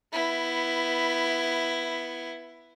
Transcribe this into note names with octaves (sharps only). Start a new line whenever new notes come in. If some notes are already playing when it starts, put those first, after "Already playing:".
B3 E4